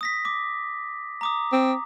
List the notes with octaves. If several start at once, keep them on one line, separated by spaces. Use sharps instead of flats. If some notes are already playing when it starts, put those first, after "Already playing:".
D#6 A#6 B6
D6
A#5 D6 D#6
C4